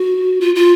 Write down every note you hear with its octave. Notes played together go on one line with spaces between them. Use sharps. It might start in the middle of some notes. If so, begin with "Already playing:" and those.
Already playing: F#4
F4
F4